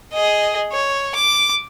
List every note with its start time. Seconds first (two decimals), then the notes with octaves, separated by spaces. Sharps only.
0.14 G#4 D#5
0.72 C#5
1.15 D6